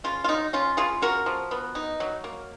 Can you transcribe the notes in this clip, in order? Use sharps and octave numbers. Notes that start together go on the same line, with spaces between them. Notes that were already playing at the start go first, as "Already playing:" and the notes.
C#3 F4
F4
F#3 D#4
C#4 F4
C#3 F4 G#4
C#3 F#4 A#4
F3
B3
D#4
F#3
A#3